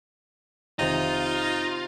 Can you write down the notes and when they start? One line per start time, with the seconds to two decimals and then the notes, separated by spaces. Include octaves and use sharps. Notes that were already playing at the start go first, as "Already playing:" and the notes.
0.79 F1 C3 D#3 D#4 F4